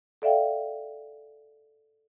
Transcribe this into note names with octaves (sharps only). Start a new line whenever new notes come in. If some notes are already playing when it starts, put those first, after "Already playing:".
A4 D5 E5 F5 G5